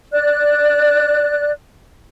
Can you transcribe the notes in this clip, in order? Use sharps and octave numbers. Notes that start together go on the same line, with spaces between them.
D5 F#6